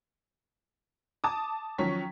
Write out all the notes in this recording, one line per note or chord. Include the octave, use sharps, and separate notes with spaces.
A5 D6 D#6
D#3 F3 F#3 C#4 C#6 B6